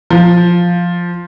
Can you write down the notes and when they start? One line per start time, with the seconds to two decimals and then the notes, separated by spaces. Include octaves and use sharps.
0.10 F3